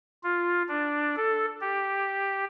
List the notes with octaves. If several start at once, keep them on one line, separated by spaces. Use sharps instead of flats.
F4
D4
A4
G4